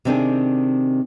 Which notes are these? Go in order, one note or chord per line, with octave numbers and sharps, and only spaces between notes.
C3 D#3 C4 D4 G#4